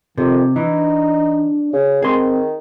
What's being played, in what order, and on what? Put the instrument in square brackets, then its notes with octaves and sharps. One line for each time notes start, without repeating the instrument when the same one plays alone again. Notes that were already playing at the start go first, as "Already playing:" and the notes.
[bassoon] F2 [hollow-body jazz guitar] C3 [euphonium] D#3
[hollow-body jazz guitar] E3 [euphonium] D4 [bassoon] D#4
[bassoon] C#3 [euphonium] F#4
[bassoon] D#3 [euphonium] C4 [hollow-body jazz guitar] G#4 C6